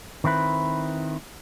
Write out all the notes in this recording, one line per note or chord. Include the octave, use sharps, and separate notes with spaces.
D#3 C4 E4 B4